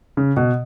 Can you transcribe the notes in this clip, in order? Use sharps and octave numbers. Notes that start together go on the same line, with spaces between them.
C#3
B2